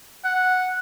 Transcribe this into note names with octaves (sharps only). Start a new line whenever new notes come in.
F#5